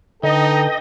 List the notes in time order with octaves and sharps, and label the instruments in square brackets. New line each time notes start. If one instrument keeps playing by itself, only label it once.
[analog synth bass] D3 [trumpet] D#4 [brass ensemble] A4 B4 G5 [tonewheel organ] D#5